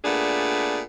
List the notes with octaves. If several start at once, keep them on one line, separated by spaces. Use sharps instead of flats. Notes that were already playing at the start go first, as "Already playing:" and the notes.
A#2 A3 B3 D4 G#4